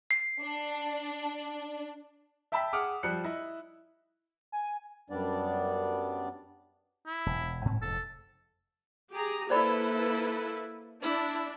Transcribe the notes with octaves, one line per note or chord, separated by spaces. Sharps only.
C7
D4
E5 G5 A5 B5 E6 B6
G#4 F#5 D6 D#6 F6
F3 G3 F#6 C#7
E4 D#5
G#5
F#2 G3 B3 D4 D5
E4
E1
G#2 C4
F1 G#2 A4
G4 G#4 A#5
A#3 E4 A4 B4 C5 D5 B5
D4 E4